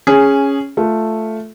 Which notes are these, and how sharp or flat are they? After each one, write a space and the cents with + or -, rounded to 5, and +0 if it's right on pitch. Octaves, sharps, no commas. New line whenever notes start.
C#4 +0 G#4 -5
A3 +0 F4 +0